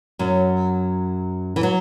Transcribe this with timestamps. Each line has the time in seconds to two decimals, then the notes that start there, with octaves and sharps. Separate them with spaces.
0.19 F#2 F#3
1.56 E3
1.63 F#3